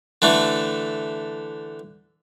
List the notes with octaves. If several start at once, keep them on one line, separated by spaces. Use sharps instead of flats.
D3 E3 A3